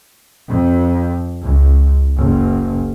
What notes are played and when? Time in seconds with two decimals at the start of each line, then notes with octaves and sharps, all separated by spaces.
0.49 F2
1.43 C#2
2.17 F#1